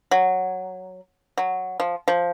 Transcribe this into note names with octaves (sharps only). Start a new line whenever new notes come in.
F#3
F#3
F3
F3